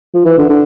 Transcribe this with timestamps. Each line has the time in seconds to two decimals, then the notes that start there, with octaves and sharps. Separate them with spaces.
0.14 F3
0.25 E3
0.38 D3
0.49 D3